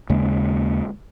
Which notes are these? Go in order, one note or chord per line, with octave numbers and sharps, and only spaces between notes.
D#2 C#3 G#3 A#3